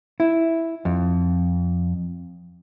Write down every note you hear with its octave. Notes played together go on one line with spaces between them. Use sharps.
E4
F2